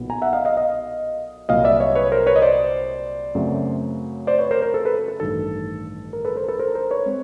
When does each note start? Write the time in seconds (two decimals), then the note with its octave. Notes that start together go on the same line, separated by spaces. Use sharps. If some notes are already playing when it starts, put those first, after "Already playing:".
Already playing: B1 A#2 F#3 B3
0.10 G#5 A#5
0.22 E5 F#5
0.33 D#5 F5
0.45 D#5 F5
0.57 D#5 F5
1.49 C2 A#2 F#3 A#3 D#5 F5
1.64 D5 E5
1.80 C#5 D#5
1.95 B4 C#5
2.12 A#4 C5
2.26 B4 C#5
2.36 D#5
2.42 C5 D5
3.35 F#2 C#3 F#3 A3 C4
4.27 C5 D5
4.39 B4 C#5
4.51 A#4 C5
4.62 A#4
4.74 A4
4.85 A4 B4
5.08 A4
5.20 A1 G2 D#3 A4
6.13 A#4
6.25 A4 B4
6.36 A#4 C5
6.49 A4 B4
6.59 A#4 C5
6.75 A#4 C5
6.91 B4 C#5
7.06 G#3 C4